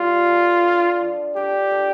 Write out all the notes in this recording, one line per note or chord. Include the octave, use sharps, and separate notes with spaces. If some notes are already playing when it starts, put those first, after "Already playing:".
Already playing: G3 F4
A4
D4
F3
D4 G4
A4